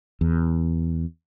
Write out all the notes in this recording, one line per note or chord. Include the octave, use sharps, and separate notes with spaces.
E2